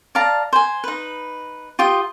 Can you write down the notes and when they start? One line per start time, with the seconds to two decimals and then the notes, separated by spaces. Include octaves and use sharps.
0.15 D5 F5 A5 A#5
0.53 C5 G#5
0.84 D#4 B4
1.79 F4 G4 D#6